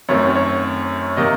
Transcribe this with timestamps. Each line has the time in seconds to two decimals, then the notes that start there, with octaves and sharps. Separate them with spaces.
0.09 F#2 D#3 A3 C4 C#5
0.35 C#5
1.16 C3 D#3 A#3 D#5